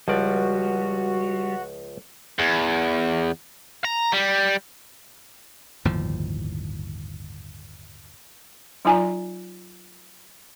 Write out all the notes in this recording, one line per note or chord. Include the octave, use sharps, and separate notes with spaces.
C#2 F3 G3 F#4 D5
E2
A#5
G3
G1 D#2 A2 F3
F#3 D#4 F4 D5 G#5 A#5